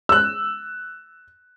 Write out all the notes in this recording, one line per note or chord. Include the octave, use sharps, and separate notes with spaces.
E6 F#6